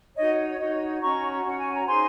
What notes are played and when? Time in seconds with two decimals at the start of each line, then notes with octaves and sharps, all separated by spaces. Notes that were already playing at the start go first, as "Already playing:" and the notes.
0.17 D#4 F#4 C#5 D#5
0.59 D#4 F#4 C#5 D#5
1.01 C#4 F#4 C#5 A#5 C#6
1.44 C#4 F#4 C#5 F#5
1.60 G#5
1.74 A#5
1.87 D#4 G#4 C5 G#5 C6